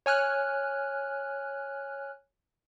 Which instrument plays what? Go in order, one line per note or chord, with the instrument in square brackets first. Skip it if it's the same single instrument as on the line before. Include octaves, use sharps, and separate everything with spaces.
[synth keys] C#5 G#5 F6 F#6